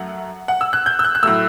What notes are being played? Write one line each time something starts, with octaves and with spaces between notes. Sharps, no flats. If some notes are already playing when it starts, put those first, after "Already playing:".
Already playing: F#2 F#3 A3 F#5
F#5
E6
F#6
G6
E6
F#6
F#6
A2 F#3 A3 E6